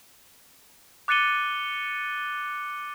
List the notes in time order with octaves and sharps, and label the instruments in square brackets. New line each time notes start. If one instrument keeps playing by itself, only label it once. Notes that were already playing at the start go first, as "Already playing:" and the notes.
[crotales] D6 F#6 A6 C#7 D#7 G7